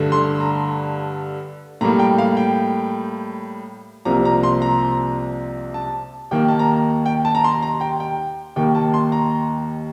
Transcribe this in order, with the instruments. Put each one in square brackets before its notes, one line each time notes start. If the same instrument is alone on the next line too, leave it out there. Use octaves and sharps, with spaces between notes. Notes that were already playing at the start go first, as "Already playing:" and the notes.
Already playing: [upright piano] G2 D3 A3
C6
A#5
A2 G3 A#3 A#5
G5
F5
G5
C2 C3 F3 A#3 A#5
A#5
C6
A#5
A5
D#2 D#3 A#3 G5
A5
A#5
G5
A5
A#5
C6
A#5
G5
G5
D#2 D#3 A#3 G5
A5
C6
A#5